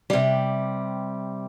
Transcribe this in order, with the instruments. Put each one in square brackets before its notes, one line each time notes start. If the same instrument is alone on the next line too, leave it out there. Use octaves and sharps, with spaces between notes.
[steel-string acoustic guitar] C3 G3